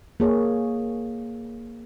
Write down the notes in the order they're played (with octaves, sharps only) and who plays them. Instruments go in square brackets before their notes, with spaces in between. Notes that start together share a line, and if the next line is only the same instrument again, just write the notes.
[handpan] A#3 G#4 C#5